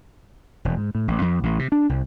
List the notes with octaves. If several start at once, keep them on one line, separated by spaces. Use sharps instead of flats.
E1
G#2
A2
A1
F2
A1
C3
D4
C2